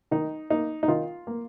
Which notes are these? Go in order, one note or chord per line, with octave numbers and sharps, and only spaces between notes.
D#3 D#4
A#3 D#4
D#4
D#3 F4
A#3